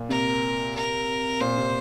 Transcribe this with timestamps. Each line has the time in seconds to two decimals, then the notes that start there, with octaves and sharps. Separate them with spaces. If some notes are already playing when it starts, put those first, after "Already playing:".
Already playing: A#2
0.09 C3 A#4
0.75 A#4
1.40 A#2 C5
1.57 C3